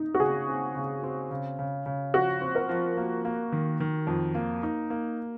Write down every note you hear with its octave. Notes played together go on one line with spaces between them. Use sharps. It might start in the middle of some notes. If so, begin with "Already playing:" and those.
Already playing: D#4
F#4
C#3 G#4
C4
C#3
C4
C#3
C#3
C#3
F3 F#4
C4
A#4
F3
A#3
A#3
D#3
D#3
F2
A#3
D#4
A#3